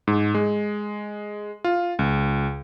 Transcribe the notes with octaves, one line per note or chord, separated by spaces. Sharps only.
G#2
G#3
F4
C#2